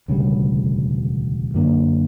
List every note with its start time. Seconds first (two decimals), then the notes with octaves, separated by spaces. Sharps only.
0.08 E1 D2 C#3 G3
1.54 F#2 D3 A#3